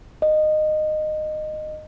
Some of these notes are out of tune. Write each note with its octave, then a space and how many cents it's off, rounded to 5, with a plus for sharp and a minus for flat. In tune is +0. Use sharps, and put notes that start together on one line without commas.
D#5 -15